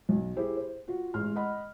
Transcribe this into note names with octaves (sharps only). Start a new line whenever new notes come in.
B1
E4 G4 G#4 C5
C5
F4 F#4
A1 G#3 C6 F6
D#5 F#5 B5